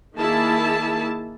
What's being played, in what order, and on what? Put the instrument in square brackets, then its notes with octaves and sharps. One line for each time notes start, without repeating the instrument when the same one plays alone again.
[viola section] D#3 A#3 E4 G#4 A5